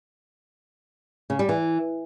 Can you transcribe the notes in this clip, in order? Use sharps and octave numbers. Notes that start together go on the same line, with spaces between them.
C#3
G3
E3